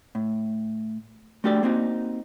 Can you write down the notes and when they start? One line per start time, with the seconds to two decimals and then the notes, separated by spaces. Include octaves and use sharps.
0.15 A2
1.44 A3 D4 F#4 G4 A4 D5
1.63 A#3 C4 D#4 F#4